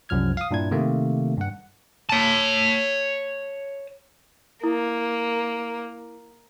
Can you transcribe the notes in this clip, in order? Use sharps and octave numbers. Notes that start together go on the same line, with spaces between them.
C2 F#2 F3 F6 G#6
F5 D#6
G2 A#2 D4 E4 G#6
C3 D#3 A3 A#3
G2 F#5
C#5 A5
A#3 E4